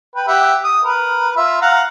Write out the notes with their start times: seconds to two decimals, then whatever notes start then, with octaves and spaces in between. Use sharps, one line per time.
0.16 B4 G5
0.28 G4 E5 F#5
0.64 D#6
0.84 A#4 B4
1.37 F4 E5
1.62 F5 F#5 A#5